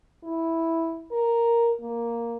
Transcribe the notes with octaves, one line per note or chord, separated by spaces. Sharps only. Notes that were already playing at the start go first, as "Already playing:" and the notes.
E4
A#4
A#3